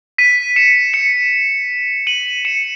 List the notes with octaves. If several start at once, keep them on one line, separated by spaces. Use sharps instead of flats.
B6 D#7
C#7 E7
C#7 E7
D#7 F#7
C#7 E7